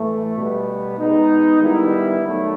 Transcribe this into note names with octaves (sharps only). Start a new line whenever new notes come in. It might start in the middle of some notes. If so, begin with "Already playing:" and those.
Already playing: A2 E3 A3
B2 G3 B3
G#3 B3 D#4
D#3 G3 B3 E4
D#3 F#3 A3